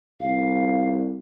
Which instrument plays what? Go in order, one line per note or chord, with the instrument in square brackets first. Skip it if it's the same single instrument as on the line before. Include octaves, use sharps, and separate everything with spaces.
[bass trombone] C2 [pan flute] F5